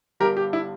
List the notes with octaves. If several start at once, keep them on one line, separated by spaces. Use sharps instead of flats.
G1 G2 G3 G4 A#4
G4
E4